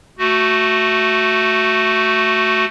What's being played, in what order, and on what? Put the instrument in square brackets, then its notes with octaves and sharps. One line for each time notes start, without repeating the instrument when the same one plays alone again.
[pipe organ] A3 F#4